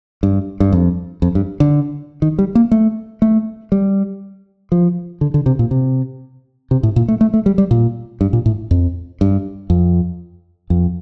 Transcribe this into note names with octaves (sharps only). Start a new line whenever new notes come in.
G2
G2
F2
F2
G2
D3
D#3
G3
A#3
A3
A3
G3
F3
D3
D3
C3
A#2
C3
C3
A2
A#2
A3
A3
A3
G3
G3
A#2
G2
A#2
A2
F2
G2
F2
F2